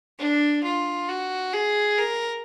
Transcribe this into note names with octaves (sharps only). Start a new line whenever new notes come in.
D4
F4
F#4
G#4
A#4